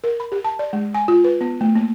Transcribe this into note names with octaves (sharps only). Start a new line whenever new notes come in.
A#4
B5
G4
A5
D5
G#3
G#5
F4
B4
B3
A3
A#3